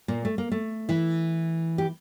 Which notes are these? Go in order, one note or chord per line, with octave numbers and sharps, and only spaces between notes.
A#2 A#3
A3
A#3
A3
E3 E4
G4